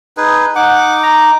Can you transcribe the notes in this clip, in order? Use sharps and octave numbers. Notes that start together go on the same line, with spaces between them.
D#4 G#4 B4
D#4 F#5 D6
A#5